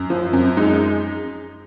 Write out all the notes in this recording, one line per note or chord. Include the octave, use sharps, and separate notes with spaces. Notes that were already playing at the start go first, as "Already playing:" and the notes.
Already playing: F#2
F3
F#2
G#3 D#4